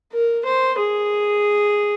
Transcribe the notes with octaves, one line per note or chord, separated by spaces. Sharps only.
A#4
C5
G#4